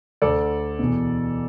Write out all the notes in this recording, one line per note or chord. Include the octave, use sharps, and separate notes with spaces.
D2 D3 A4 D5
E2 B2